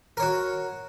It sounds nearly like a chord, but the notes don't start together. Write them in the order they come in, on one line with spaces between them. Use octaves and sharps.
A#4 C#5 F#4